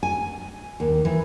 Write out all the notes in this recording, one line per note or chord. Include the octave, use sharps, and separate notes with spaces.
G#5
D#2
E3